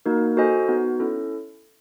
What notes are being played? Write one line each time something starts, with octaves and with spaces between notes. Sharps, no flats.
A#3 D#4 F#4 A#4
F#4 A4 C5 D#5 G#5
B3 D#4 F#4
C#4 E4 A4